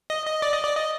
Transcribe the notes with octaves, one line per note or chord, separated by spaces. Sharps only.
D#5
D#5
D5
D#5
D5
D#5